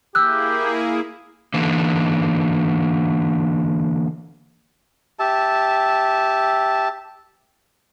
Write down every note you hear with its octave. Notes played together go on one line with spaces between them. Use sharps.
A#3 E4 G4 G#4 E6 F#6
D3 E3 A#3
G4 E5 A5